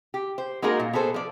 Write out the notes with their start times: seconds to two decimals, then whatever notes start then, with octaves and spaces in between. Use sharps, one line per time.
0.14 G4
0.38 C5
0.62 G#3 A#3 D#4 F#4 G#4 A#4
0.80 A#2
0.93 B3 G#4 A4 C5
1.14 F3 D5